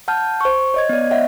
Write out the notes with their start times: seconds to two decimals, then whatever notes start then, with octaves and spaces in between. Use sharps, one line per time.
0.08 F#5 A5 F6 G6
0.41 C5 C#6
0.74 C#5 D#5 G#6
0.89 B3 D5
1.11 C#5 D#5 E5 F#5